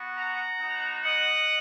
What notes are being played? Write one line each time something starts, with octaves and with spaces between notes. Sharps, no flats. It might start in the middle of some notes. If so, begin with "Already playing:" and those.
Already playing: B3 F#4
F#5 A#5
B3 D#4 F#4
D#5 F#5